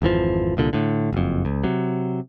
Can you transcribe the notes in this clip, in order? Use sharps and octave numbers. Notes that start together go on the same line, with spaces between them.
G#1 F2 E3 F3
C2 A#2 D3
A2 D3
F#1 F2
C#2
C3 F#3